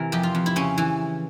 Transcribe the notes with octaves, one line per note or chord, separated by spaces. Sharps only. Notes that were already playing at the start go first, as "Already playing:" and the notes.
Already playing: C3 E3 A#4
F2 G4
F4
F2
E4
C#3 C#4
E3